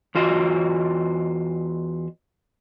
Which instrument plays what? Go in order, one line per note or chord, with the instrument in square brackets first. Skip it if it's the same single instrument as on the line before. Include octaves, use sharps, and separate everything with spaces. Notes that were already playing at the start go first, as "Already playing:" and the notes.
[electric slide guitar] E2 F4 F#4 D#5